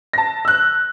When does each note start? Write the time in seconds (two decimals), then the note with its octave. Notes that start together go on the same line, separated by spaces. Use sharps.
0.13 A5 A#6
0.45 E6 F#6